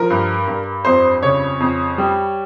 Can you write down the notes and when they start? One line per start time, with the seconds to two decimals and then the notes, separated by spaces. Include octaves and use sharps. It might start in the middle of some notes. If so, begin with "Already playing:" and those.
Already playing: F3 A#4
0.10 G2
0.48 G2
0.85 F2 C5
1.23 C#3 C#5
1.60 F2
1.98 G3